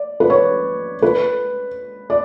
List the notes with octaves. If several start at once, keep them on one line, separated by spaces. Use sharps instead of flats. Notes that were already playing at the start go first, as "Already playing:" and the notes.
Already playing: D5
B4
C#5
B4
D5